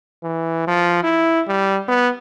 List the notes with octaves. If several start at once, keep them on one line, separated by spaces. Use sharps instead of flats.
E3
F3
E4
G3
B3